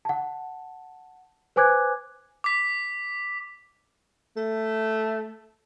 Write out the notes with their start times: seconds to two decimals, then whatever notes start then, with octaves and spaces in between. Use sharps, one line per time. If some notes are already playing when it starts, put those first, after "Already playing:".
0.05 F#5 A5
1.56 B4 C5 G#5 D6 F#6 G#6
2.44 D6 B6
4.37 A3